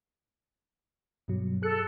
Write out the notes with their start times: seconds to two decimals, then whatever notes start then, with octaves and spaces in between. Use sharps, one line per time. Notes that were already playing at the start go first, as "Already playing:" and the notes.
1.28 G2 B2 F#3
1.62 G#4 A4 F#6 C#7